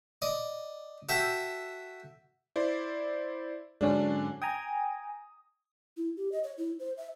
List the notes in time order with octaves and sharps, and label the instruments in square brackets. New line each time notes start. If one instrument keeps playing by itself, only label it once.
[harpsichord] D5 D#5
F#4 A4 E5 G5
[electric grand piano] E4 C5 D5
[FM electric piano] G#2 F#3 C#4 [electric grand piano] D3 D4
[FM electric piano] G5 G#5 A#5 [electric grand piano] D#6
[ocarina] E4
G4
D#5
C#5
E4
C5
E5